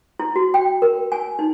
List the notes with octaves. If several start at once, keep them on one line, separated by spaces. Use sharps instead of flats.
E4
F#4
G5
A#4
G#5
D#4